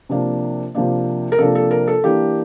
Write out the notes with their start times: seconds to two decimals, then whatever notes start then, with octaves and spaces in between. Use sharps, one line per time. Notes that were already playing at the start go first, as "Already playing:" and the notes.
0.09 C3 F3 A#3 D4
0.75 C3 F3 A#3 D4
1.32 A#4
1.38 C3 F3 A#3 D4 A4
1.55 A4
1.71 A#4
1.87 A4
2.04 E3 A#3 D4 G4